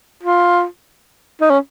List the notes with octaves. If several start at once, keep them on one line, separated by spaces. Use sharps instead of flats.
F4
D#4
C#4